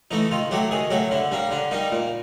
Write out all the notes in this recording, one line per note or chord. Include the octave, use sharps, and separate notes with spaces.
E3 A3 D#4
D#3 F4
F#3 A3 G4
D#3 G#4
F#3 A3 G4
D3 E4
G3 A#3 D4
D3 D4
G3 A#3 D#4
A#2